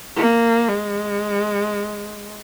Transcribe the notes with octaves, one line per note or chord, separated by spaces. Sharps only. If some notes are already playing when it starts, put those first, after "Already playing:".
A#3
G#3